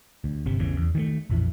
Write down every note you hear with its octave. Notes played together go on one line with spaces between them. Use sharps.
D2
G1 C3
A1 E2 C#3
E2
D#3 E3 A3
A#1 F2 E3